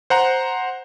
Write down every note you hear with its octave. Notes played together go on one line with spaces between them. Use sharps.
C5 F#5 A#5